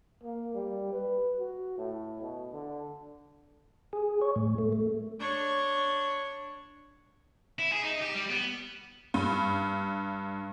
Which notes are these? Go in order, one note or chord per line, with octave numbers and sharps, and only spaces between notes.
A#3
G3
B4
F#4
A2
B2
D3
G#4
C#5
A2
A3
A3
D4 C#5
E4
G#4
D#4
G4
G3
B3
G2